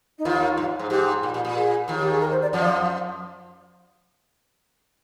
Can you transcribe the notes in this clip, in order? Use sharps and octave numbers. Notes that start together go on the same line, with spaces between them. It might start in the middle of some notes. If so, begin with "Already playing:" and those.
D#4
D#2 D#3 F4
G2
G#2
G#2 G4
A#2
A#2
A#2
G#4
D#2 D#3
G4
G#4
A#4
C5
D5
F2 F3 D5
F5